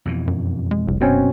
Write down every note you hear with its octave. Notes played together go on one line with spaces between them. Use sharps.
F2 B2 E3
F#2
G#3
F1 C2
F#2 B2 C4 C#4